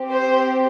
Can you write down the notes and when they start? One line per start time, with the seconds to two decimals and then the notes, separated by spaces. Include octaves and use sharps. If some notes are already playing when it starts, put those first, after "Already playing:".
Already playing: C4 G4
0.11 C5